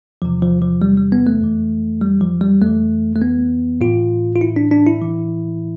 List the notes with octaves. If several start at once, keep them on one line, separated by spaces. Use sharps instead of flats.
E2 C3 E3 F3
F3
F3
G3
G3
B3
A3
F2 E3
G3
F3
G3
F2 E3 A3
A3
B3
A2 E3 F4
F4
E4
D4
D4
E4
A2 E3